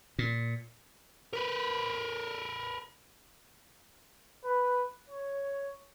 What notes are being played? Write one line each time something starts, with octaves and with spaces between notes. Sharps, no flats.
A#2
A#4 B4
B4
C#5